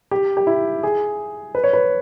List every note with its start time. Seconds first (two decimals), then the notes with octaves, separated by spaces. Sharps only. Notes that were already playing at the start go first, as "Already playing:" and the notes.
0.11 G4
0.37 G4
0.47 E4
0.83 G#4
1.55 B4
1.64 C#5
1.73 B4